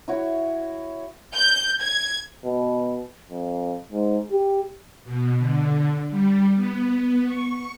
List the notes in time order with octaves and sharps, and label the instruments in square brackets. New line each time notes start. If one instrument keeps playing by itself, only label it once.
[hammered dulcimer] E4 F#4 C#5
[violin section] G6
G#6
[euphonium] B2
F2
G#2
G4
[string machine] B2
D3
G3
B3
C#6